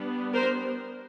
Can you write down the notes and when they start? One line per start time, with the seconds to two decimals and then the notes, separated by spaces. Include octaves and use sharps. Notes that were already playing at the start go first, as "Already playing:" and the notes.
Already playing: G3 B3 D4
0.33 A#4 C5